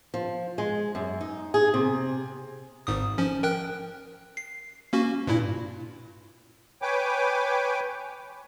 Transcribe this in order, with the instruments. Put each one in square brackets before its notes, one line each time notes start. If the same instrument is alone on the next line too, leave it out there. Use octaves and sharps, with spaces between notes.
[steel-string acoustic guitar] F3
G#3
F#2
D#4
G#4
C3
[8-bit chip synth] G#1 G#2 D#6
F3 C#4
A#4 G5 F#6
C7
A#3 C#4 F#4
G2 A#2 E4
[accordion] B4 C#5 G5 G#5 D6